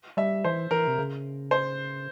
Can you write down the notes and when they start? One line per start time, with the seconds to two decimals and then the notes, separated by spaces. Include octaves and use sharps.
0.17 G3 E5
0.44 E3 C5
0.71 E3 A#4
0.87 C3
0.99 C#3
1.51 C5